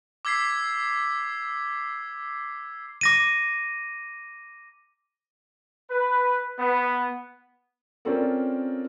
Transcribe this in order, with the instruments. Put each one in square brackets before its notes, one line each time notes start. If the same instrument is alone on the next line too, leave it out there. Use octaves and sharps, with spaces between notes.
[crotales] D6 E6 G#6 B6 C7
[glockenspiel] D6 A#6 D#7
[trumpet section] B4
B3
[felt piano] C4 C#4 F4 A4 A#4 D5